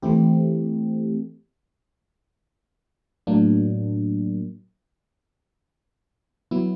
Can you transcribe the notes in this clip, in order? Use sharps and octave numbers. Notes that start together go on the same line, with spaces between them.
E3 A3 C4 E4 G4
A2 F#3 A#3 D4
F#3 B3 E4